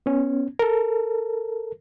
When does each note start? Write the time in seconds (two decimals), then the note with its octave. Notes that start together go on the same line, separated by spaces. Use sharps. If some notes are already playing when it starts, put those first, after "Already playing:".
0.06 B3 C#4
0.59 A4 A#4